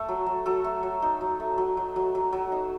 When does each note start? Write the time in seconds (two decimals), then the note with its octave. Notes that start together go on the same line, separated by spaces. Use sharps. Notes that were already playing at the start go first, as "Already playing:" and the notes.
Already playing: A3 A4
0.09 F#3
0.26 F#3
0.46 F#3 A4
0.64 A3
0.83 F#3
1.02 D#4
1.21 F#3
1.40 A3
1.58 F#3
1.77 F#3
1.96 F#3
2.15 F#3
2.33 F#3
2.52 D#4